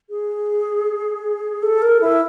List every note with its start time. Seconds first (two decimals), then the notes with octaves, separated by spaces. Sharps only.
0.10 G#4
1.63 A4
1.82 A#4
2.01 E4